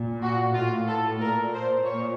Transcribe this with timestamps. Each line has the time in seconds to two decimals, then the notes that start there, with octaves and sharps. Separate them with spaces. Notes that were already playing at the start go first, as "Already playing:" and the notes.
Already playing: A#2
0.22 F#4
0.54 A2 F4
0.87 A4
1.21 A#2 A#4
1.53 C5
1.85 A#2 C#5